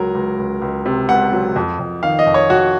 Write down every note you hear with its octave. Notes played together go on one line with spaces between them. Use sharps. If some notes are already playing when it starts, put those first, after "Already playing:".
Already playing: C#2 F#3 A#4
C#2
C#2
C#2
C3
C#2 F#5
F#3
F2
F2
D#3 F5
D#5
F2
C#5
F2 F#4